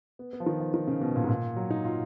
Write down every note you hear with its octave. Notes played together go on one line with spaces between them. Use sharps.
B3
B3
F3
D#3
F3
D#3
C#3
B2
A#2
G#2
A#2
F#3
D#4
F4